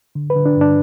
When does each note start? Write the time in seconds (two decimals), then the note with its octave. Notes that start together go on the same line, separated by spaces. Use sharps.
0.15 D3
0.30 B4
0.36 D3
0.46 D4
0.57 G2 D4